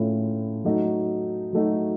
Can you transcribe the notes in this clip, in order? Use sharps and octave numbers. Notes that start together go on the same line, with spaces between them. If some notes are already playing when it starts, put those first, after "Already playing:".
Already playing: A2 A3 C#4 F4
F#3 A3 D#4 F#4
F#3 A3 D#4 F#4